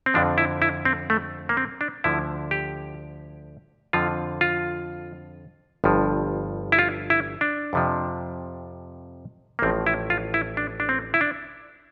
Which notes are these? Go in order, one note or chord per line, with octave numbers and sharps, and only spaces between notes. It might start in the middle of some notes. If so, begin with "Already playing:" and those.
C4
F2 D3 F3 D4
E4
E4
C4
A3
A#3
C4
D4
D2 D3 F3 E4
G4
F2 D3 F3 F4
F4
G1 G2 F3
E4
F4
E4
D4
F2 C3 F3
A#3
A1 A2 F3 C4
E4
F4
E4
D4
D4
C4
E4
D4